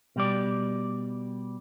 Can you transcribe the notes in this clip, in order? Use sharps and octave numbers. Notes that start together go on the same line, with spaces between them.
B2 G3 D5